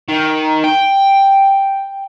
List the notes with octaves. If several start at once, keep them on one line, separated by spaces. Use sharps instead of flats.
D#3
G5